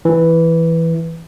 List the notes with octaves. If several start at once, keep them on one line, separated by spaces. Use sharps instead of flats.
E3